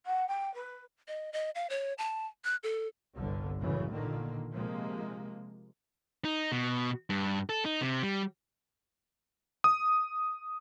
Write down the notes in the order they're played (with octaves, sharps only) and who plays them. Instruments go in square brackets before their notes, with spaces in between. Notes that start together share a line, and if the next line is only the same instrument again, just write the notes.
[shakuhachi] F#5
G5
B4
[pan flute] D#5
D#5
F5
C#5
A5
F#6
A4
[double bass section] G1 C2 G2 D3
A1 F#2 C#3 E3 G#3
A#2 D3 D#3 A#3
C3 F3 G#3 A#3
[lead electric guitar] D#4
B2
G2
A4
D#4
C3
G3
[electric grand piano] D#6